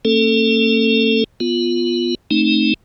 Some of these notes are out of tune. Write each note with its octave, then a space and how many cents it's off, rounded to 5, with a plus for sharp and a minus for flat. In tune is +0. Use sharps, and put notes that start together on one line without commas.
A#3 -45 C#4 -35 A4 +10
B3 +0 F4 +0
A3 +0 C4 +25 D#4 +0